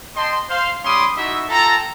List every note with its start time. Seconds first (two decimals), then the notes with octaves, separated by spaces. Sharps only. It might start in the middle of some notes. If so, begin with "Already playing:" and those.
0.16 D#5 G5 A5 C6
0.49 C5 F5 C6
0.84 G3 C#4 B5 C6 D6 D#6
1.17 D#4 E4 F#4 E5
1.49 F4 A4 G5 A5 A#5